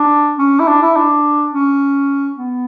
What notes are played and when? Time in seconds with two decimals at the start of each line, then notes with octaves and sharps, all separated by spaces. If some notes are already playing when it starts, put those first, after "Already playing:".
Already playing: D4
0.39 C#4
0.60 E4
0.68 D4
0.82 E4
0.96 D4
1.53 C#4
2.37 B3